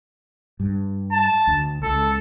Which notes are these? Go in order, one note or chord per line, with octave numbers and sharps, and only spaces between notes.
G2
A5
D2
C#2 A4